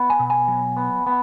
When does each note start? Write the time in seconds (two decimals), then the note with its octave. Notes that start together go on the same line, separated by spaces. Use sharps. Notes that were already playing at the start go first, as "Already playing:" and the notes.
Already playing: B3
0.10 G#5
0.19 B2
0.30 G#5
0.48 F#3
0.77 B3
1.06 B3